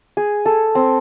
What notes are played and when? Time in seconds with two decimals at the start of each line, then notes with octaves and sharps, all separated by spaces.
0.17 G#4
0.46 A4
0.75 C4